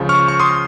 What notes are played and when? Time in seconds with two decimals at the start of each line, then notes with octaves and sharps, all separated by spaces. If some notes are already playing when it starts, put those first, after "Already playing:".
Already playing: C#2 C#3 F3
0.09 C#6 F6
0.28 C#6
0.39 C6 D#6